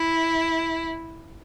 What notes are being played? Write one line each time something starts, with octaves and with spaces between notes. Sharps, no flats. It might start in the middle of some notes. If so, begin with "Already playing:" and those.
Already playing: E4